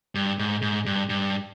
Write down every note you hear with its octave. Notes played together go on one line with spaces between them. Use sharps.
G2
G#2
G#2
G2
G2